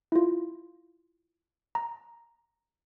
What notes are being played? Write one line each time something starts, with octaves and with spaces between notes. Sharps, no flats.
E4 F4
A#5